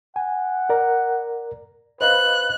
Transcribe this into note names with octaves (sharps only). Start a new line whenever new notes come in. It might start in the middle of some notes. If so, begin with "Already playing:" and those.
F#5 G#5
A#4 D5 A#5
B4 C5 D#5 F5 F#6